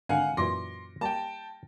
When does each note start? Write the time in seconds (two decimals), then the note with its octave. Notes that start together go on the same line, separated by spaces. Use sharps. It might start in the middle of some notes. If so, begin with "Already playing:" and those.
0.09 G#1 D3 A#4 F5 F#5 G#5
0.37 F#2 A#2 E3 C6 D6 A#6
1.01 G3 A#3 G5 A5